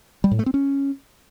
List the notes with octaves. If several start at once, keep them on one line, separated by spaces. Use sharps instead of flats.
G3
A2
A3
C4
C#4